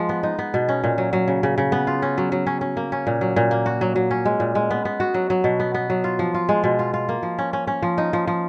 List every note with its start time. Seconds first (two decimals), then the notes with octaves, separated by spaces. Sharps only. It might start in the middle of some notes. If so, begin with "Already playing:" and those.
Already playing: F3 G#3
0.09 B3
0.23 D#4
0.39 B3
0.54 B2
0.69 C#4
0.84 A#2
0.98 F#3
1.13 F#3
1.28 C#3
1.43 C#3
1.58 C#3
1.72 B3
1.87 F4
2.02 C#4
2.18 F#3
2.32 F#3
2.47 C#4
2.61 C#4
2.77 A#3
2.92 C#4
3.07 A#2
3.21 F#3
3.36 A#2
3.51 A#3
3.66 F#4
3.81 F#3
3.96 F#3
4.11 C#4
4.25 G#3
4.40 A#2
4.55 G#3
4.71 B3
4.85 B3
5.00 F#4
5.14 F#3
5.30 F#3
5.44 B2
5.60 B3
5.74 B3
5.90 F#3
6.04 F4
6.19 F3
6.34 F4
6.49 G#3
6.64 B2
6.79 F4
6.94 F4
7.09 A#3
7.23 F3
7.38 C#4
7.53 C#4
7.67 C#4
7.82 F3
7.98 D#4
8.13 F3
8.27 F3